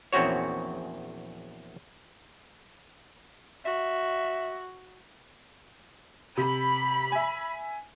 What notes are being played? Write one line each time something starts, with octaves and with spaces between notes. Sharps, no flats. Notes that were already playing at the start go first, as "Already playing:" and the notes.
A#1 E2 C4 C#4 F#4 C#5
F#4 E5
C3 B5
E5 G#5